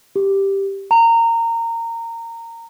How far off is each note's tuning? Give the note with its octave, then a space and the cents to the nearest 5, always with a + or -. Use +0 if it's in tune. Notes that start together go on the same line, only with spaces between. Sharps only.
G4 +0
A#5 -20